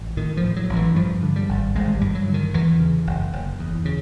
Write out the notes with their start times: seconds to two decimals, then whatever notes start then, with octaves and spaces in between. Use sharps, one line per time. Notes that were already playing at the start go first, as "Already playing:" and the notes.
Already playing: A1
0.17 A2 D#3
0.37 F3
0.43 A2
0.56 F#3
0.69 A1
0.76 E3
0.96 G2 F3
1.23 D3
1.36 G3
1.49 G#1
1.75 G#1 G#3
1.95 G3
2.01 G2
2.15 F#3
2.28 D3
2.34 D#3
2.54 E2 E3
2.80 C#3
3.07 F#1
3.33 F#1
3.59 E2
3.85 C#3